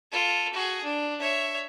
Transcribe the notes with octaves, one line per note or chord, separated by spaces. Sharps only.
F4 A4
F#4 G#4
D4
C#5 E5